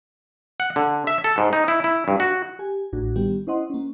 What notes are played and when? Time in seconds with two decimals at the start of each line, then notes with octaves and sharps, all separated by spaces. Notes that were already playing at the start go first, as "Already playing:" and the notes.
0.60 F#5
0.76 D3
1.07 E5
1.24 A4
1.38 G#2
1.53 D#4
1.68 E4
1.84 E4
2.08 G2
2.20 F#4
2.59 G4 G#5
2.93 A1 A2 D4 F#4
3.16 D#3 G3 B3 G4
3.47 C#4 E4 C5 D#5 F#5 C6
3.70 A#3 C#4